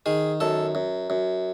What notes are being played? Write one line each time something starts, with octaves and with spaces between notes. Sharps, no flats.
D#3 G#4
F#2 A4
F#2
F#2